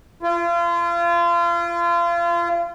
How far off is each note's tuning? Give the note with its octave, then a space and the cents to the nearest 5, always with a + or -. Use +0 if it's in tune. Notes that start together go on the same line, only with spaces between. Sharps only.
F4 -35